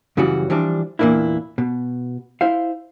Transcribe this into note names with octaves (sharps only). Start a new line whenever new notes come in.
F#2 C#3 E3 F#3 G3 F#4
E3 F3 G3 D4
E2 A#2 E3 A#3 D4 E4
B2
E4 C5 F5